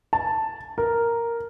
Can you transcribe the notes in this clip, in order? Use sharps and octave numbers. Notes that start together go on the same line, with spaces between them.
A5
A#4